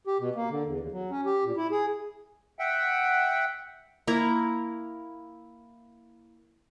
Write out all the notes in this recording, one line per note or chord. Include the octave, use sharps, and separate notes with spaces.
G4
B2
A#3
D3
E2
D#2
F#3
C#4
G4
A#2
E4
G#4
E5 F#5 G5
A#3 E4 A#5